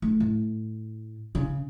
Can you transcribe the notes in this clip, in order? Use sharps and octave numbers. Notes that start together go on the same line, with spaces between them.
A3
A2
C#3